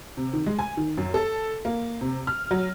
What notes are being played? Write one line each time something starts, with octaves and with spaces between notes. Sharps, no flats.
C3
D#3
G#3
G#5
D#3
F#2
A4
A#3
C3
F6
F#3